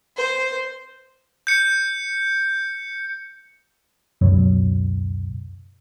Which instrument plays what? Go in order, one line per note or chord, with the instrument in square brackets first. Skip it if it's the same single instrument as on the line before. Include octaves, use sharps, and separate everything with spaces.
[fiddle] C5
[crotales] G6 C#7
[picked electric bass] C#2 F#2 B2 F#3